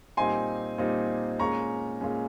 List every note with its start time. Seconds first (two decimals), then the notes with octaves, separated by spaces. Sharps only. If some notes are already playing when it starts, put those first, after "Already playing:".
0.17 A#2 G3 C4 D#4 G#5 C6
0.78 A#2 G3 C4 D#4
1.39 A#2 G#3 C#4 A#5 C#6
2.01 A#2 G#3 C#4